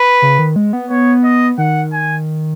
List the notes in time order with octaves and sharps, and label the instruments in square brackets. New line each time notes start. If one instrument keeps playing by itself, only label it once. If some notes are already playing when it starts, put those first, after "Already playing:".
Already playing: [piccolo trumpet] B4
[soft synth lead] C#3
D#3
G#3
B3
[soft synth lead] B3 [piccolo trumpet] C#5
[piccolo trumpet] D#5
[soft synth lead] D#3 [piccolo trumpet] F#5
[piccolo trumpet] G#5